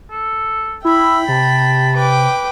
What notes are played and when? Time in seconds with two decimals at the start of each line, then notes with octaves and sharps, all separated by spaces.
0.11 A4
0.85 E4 E5 G5 B5
1.28 C3 A5
1.94 B4 G5 D6